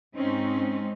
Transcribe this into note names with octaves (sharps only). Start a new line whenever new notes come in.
G#2 G#3 C4 C#4 D#4